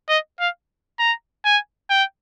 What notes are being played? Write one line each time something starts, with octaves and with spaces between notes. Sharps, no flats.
D#5
F5
A#5
G#5
G5